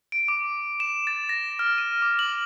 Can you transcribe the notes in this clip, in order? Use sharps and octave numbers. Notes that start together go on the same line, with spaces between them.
D7
D6
E7
A6
A#6
F6
D#7
D6
F#7